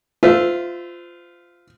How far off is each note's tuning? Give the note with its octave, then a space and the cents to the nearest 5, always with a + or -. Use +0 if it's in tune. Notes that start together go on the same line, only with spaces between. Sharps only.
F4 +0 C5 -30 E5 +0